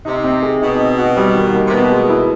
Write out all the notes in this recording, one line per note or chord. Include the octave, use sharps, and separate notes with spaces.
C3 D#4
C4
G#4
B2 D#4
C4
F#4
G3
D#3
A#3
C3
B2 B3
G#3
E4